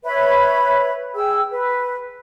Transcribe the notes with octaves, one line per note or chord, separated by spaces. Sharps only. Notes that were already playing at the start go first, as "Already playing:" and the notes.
B4 C#5 E5 B5
G#4 G5 E6
B4